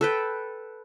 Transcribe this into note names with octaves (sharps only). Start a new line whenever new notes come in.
A4 B4 G5